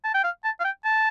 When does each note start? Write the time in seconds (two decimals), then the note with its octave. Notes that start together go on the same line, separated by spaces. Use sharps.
0.04 A5
0.14 G5
0.24 F5
0.44 A5
0.60 F5
0.65 G5
0.85 A5